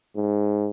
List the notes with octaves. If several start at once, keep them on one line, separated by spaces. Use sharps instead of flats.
G#2